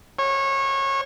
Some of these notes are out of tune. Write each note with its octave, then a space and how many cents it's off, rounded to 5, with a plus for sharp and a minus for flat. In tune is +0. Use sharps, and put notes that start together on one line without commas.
C#5 -25